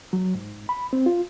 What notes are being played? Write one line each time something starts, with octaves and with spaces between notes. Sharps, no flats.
F#3
G#2
B5
C4
F4